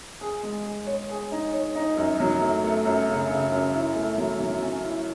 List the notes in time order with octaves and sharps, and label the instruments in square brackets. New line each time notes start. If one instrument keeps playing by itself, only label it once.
[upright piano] G#4
G#3
G#4
C#5
G#4
D#4
C#5
D#4
F#2
F#3
A3
A3
F#2
C#3
C#3
F#2
E4
A3
F#3
F#3
C#4
E4